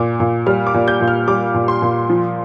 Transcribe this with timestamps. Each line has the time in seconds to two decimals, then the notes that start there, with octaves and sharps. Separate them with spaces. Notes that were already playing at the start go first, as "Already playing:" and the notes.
Already playing: A#2 D6
0.20 A#2
0.46 G3 F6
0.67 D6
0.74 A#2
0.88 G6
1.01 A#2
1.08 F6
1.28 G3 D6
1.54 A#2
1.68 C6
1.82 A#2
2.09 F3